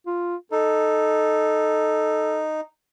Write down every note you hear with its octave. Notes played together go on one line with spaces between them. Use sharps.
F4
D#4 A4